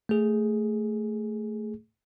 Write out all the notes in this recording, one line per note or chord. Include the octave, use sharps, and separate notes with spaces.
A3 G#4